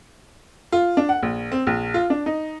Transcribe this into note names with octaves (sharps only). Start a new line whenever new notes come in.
F4
D4
F#5
A#1
C4
A#1
F4
D4
D#4